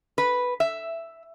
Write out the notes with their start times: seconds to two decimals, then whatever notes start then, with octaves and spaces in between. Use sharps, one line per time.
0.18 B4
0.60 E5